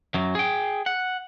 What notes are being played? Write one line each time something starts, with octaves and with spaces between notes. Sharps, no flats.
F#2 F#3
G#4 G5
F#5